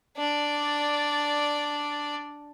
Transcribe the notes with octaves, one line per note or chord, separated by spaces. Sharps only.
D4 D5